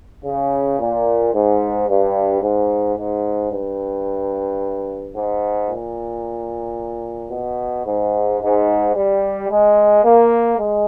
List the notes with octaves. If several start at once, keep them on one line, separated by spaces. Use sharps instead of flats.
C#3
A#2
G#2
G2
G#2
G#2
G2
G#2
A#2
B2
G#2
G#2
G3
G#3
A#3
G#3